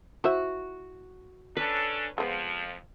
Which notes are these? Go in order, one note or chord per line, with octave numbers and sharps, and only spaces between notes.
E4 F#4 C5 E5
C#4 D4 A4 B4
F2 F3 G#3 A3 B3